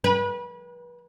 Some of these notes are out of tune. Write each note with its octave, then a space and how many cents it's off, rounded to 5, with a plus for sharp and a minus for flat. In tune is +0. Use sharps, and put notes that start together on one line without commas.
B4 -30